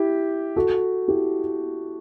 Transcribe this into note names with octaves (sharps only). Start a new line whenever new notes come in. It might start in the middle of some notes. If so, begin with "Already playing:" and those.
Already playing: E4 G4
F#4 A4
E4 G4